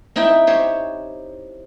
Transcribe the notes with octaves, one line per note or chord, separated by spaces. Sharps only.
C4 D#4 E4 E5 G5
G4 C5 C#5